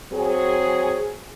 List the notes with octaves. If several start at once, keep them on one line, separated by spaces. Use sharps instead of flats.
F#3 C4 G#4